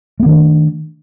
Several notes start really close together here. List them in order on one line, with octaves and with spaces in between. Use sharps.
A3 B3 D#3 D4